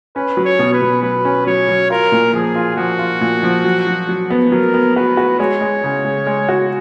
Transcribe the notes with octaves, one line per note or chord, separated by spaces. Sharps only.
C#4 B4
F#3
C#5
B2
B4
B2
F#3 B4
C#4
F#3 C#5
F#3
F4 A#4
A#2
F3 G#4
F4
F3 F#4
F4
A#2
F3
F#3
F#3
F#3
B3
F#3 A#4
B3
F#4 B4
F#4
G#3 C#5
G#3
C#3
G#3
G#3
F#4